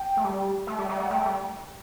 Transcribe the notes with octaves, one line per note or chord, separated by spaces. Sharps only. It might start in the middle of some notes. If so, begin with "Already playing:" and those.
Already playing: G5
A3
G3
A3
G3
D5
G3 E5
G3 F#5
A3 G5
G3